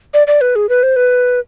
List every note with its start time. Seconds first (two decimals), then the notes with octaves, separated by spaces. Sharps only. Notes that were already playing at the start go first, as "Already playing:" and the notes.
0.14 D5
0.27 D5
0.41 B4
0.56 G#4
0.69 B4
0.83 C5
0.96 B4